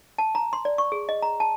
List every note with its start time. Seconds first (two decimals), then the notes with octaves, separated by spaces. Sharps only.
0.18 A5
0.35 A#5
0.53 C6
0.65 D5
0.78 C#6
0.92 G#4
1.09 D#5
1.22 A#5
1.40 A5